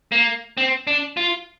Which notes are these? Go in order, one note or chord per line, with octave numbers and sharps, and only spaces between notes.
A#3
C4
D4
F4